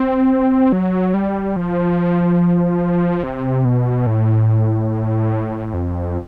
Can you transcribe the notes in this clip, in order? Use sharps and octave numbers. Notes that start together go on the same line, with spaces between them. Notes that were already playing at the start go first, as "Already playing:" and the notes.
Already playing: C4
F#3
G3
F3
C3
B2
A2
F2